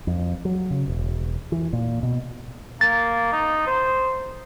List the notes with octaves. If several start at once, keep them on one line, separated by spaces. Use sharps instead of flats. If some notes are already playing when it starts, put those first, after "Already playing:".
F2
F#3
C#3
E1
E3
A#2
B2
A#3 A6
D#4
C5